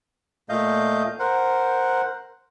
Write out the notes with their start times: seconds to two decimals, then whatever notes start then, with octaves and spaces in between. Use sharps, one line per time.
0.49 A#2 A3 D#5 F5 G6
1.19 A#4 C5 F#5